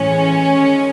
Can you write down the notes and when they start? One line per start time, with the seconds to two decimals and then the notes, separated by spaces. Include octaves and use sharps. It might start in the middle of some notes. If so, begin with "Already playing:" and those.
Already playing: A2 E3 G#3 C#4
0.56 D#3 G#3